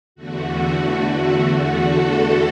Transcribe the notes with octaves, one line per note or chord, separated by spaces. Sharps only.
E2 D3 A3 F#4
A4